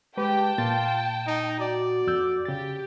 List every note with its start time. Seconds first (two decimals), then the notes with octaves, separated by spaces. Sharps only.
0.17 G#3 G4 B4 G5 A5
0.58 A#2 A#3 F4 A6
1.27 D#4
1.60 F#4 D5
2.07 F2 E6 G6
2.45 C#3 G4 A6